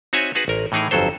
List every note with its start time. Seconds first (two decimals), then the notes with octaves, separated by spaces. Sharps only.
0.13 C4 D#4 F#4 C#5 E5 G#5
0.35 D#4 F#4 G#4 B4
0.48 A1 A#4
0.72 A2 E3 D#4 G#4 A#4
0.91 G1 F2 F#3 A4 C5